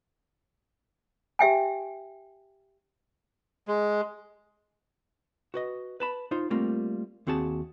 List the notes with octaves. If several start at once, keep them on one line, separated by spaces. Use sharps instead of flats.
G4 E5 G5 G#5
G#3
F#4 B4 D#5
B4 A5 B5
D#4 F4 C5
G3 A3 A#3 C4 F4
D#2 C4 F#4 G#4 A5